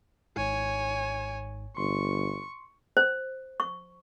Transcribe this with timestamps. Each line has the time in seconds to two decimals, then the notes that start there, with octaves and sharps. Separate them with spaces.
0.37 G#1 G#2 C#5 G#5
1.77 G1 C6 C#6
2.97 C5
3.60 C#6